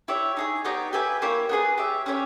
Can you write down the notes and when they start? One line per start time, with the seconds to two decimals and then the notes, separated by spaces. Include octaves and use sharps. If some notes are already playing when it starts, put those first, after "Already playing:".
0.08 E4 G4 C#5 E5
0.37 D#4 G#4 C#5
0.65 B3 D#4 G4 C#5
0.93 G4 B4 E5 G#5
1.22 A#3 E4 G4 C#5
1.49 B3 D#4 G#4 B4
1.78 G4 C#5 E5
2.06 C#4 G4 C#5